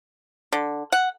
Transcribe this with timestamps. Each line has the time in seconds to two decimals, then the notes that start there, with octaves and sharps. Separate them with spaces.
0.52 D3
0.92 F#5